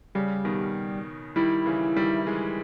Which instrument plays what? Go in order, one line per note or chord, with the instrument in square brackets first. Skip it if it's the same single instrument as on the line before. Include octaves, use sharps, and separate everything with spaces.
[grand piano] C#3 [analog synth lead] G3
[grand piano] B2 D#3
[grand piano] D#3 G3 [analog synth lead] E4
[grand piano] C#3 E3
D#3 G3
E3 G#3